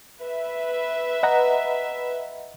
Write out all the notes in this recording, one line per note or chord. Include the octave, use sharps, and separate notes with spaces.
B4 E5
D#5 F#5 A#5